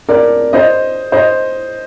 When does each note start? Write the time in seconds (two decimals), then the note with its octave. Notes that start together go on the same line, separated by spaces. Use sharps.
0.09 A#4 D5
0.53 C5 D#5
1.12 C5 D#5